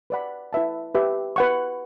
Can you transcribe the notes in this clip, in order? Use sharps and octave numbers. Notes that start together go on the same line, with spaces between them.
B4 D5 F#5 B5
E4 B4 E5 A5
G4 B4 E5
B4 F#5 C#6